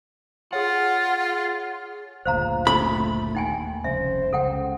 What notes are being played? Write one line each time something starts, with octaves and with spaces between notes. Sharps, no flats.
F4 G#4 C#5 F#5
F#1 D2 A#2 C5 F5 A#5
A3 B5
D#2 D#4 G5 G#5
F1 C2 C#3 C5 E5
C#2 C#3 A4 F#5 G5